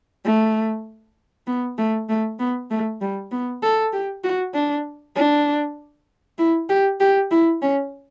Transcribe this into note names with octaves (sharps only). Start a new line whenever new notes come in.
A3
B3
A3
A3
B3
A3
G3
B3
A4
G4
F#4
D4
D4
E4
G4
G4
E4
C#4